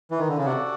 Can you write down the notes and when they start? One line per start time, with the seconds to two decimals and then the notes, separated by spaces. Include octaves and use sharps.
0.11 E3
0.19 D#3
0.29 D3
0.37 C#3
0.46 C3 F#4 A4 D5 F#5